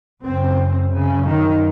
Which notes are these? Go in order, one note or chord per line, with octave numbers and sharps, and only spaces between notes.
F#2 C#3 C4
C#3
D#3